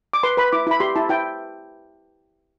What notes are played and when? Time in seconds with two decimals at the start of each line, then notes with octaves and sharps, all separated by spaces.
0.13 D6
0.23 B4 C6
0.37 B4 B5
0.52 E4 D6
0.67 E4 B5
0.80 G4 C6
0.95 E4 A5
1.09 E4 G5